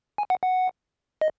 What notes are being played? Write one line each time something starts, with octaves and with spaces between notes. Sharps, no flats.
G#5
F#5
F#5
D#5